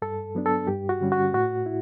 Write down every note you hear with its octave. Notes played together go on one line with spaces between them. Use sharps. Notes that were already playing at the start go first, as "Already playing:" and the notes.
G2 A4
F#3 B3 D4
A4
G2 G4
F#4
D3 G3 C#4
F#4
A2 F#4
E4